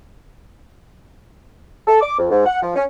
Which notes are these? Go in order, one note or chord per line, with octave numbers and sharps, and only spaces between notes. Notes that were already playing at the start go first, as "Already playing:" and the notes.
A4
D6
F2
G#2
F#5
F3
C#4